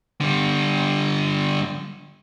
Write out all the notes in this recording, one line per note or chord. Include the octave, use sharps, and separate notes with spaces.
D3 G3